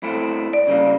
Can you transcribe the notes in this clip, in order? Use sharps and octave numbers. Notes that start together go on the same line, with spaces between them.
A2 A3 C4
D5
C#3 G3 A#3